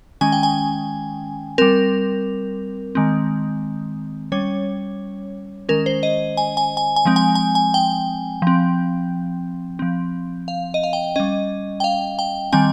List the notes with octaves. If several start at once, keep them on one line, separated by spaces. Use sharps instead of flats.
D#3 G#3 C#4 G#5
G5
G#5
G3 C4 A#4
D#3 G#3 C4
G3 C#4 C#5
D#3 G#3 C#4 A#4
C5
D#5
G#5
G#5
G#5
G#5
F3 G#3 C4
G#5
G#5
G#5
G5
F3 C4
F3 C4
F5
D#5
F5
G5
G3 C#4 D#5
G5
F5
G5
D#3 G3 C4 G#5